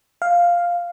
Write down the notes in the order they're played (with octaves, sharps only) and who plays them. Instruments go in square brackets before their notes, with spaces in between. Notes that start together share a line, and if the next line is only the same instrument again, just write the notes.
[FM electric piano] F5